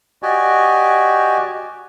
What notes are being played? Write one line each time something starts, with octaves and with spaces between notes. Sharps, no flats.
F#4 G4 D5 D#5 G#5